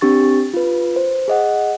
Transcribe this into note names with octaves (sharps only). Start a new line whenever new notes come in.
C4 D4 G4 C#6 A6
F4 B4
C5
G#4 D#5 F#5